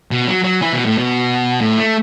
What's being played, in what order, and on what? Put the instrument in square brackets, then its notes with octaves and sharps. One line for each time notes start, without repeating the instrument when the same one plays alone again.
[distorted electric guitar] B2
F#3
F#3
E3
B2
A2
B2
A2
A3